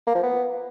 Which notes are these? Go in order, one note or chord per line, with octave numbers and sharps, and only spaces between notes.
A#3
F3
B3